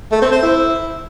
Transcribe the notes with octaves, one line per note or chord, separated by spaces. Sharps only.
A3
C4
C5
E4